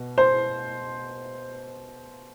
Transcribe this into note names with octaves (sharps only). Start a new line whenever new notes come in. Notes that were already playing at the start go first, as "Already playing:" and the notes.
Already playing: B2
C5